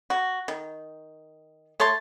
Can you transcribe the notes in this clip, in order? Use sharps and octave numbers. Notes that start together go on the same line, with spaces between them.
F#4
D#3
A3 C#5 A5 C6